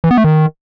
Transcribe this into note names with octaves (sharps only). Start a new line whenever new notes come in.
E3
B3
A3
D#3